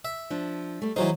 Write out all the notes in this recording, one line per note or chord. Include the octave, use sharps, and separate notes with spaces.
E5
F3 D4
G3 A3
E3 F#3 D#4 G#4 C5